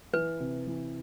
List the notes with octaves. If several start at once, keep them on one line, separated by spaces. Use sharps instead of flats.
E3 B4
C3
E3